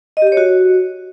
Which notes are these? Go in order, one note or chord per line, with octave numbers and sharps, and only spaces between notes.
D#5
G4
D#5
C#5
F#4